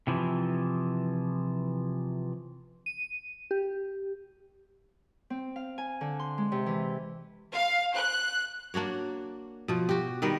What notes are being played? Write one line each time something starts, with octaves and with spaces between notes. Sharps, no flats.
C3 E3 F3
D#7
G4
C4
F5
G#5
D3
C6
G#3
C3
E3
F5
F#6
A#3 D4 F#4 C#5
B2 F3
F#4 G4
D#3 G3 B3 A#4